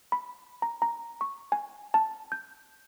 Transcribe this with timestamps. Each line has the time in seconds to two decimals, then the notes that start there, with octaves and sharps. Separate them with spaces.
0.12 B5
0.62 A#5
0.82 A#5
1.21 C#6
1.52 G#5
1.94 A5
2.32 G6